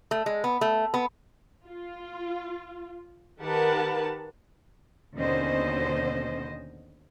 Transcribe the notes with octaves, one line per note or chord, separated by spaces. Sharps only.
A3
G#3
B3
A3
B3
F4
D#3 G4 A#4 B4 F#5 A5
D#2 B2 D3 C#4 C5 D#5